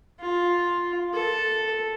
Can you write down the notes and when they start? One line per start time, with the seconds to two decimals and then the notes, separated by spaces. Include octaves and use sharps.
0.20 F4
1.14 A4